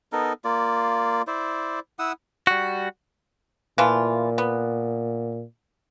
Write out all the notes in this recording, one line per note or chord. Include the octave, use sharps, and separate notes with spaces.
B3 D#4 A4 A#4
A#3 F4 D5
E4 C5 D5
E4 F#5 D#6 E6
G3 F#4
A#2 E3 A3 F4
B3